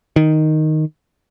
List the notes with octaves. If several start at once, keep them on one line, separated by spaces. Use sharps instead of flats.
D#3